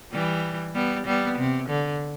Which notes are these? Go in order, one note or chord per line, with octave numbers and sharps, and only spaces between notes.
E3 G3
G3 B3
G3 B3
C3
D3